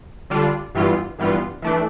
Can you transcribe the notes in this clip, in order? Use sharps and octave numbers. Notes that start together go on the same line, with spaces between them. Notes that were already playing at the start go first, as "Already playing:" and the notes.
D3 G3 D4 F4
G2 E3 G3 B3 F4
G2 E3 G3 B3 F4
E3 A3 D4